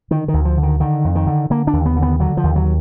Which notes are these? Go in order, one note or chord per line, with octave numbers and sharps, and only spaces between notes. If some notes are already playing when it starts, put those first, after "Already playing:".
D3 D#3
D#3
D2
F3
D3
D#3
D3 D#3
F2
D#3
D3
D3 A#3
D4
D#2
B3
D3
B3
D3 F#3
F3
D#2
F#3